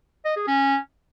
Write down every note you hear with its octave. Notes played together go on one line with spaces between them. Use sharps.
D#5
G#4
C#4